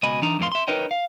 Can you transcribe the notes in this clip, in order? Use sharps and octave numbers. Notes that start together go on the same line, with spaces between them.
C#2 B2 D#5 G#5 B5
E3 D4 D#4 A#5
F2 A2 E3 D4 F5 C6
E5 C6
D#4 A#4 B4 C#5 D#5 G5
F5